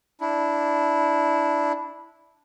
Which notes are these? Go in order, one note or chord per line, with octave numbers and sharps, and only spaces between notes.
D4 E4